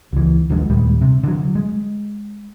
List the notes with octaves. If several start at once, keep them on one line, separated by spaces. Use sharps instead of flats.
C#2 E3
D2 D3 F3 G#3
D#2 A#2 G3 G#3
C3
D3 F#3
G#3